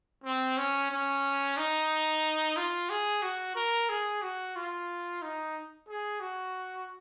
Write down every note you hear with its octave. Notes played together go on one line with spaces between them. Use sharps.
C4
C#4
C#4
D#4
F4
G#4
F#4
A#4
G#4
F#4
F4
D#4
G#4
F#4